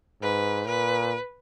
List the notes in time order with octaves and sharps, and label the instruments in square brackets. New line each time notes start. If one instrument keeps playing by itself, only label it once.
[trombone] G#2 [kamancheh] B4
[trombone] A#2 [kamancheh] B4